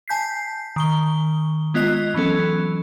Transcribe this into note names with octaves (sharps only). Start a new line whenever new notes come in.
G#5 A5 G6 B6 C7
D#3 C#6 G7
G#3 B3 F4 D#5 F#6 F7
E3 F#3 B3 C#4 A4